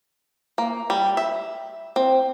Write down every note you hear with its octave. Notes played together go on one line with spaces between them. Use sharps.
A#3
G3
E5
C4